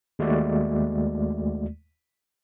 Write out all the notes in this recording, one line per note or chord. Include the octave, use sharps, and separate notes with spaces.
D#2 G#3 A3 F#4 D5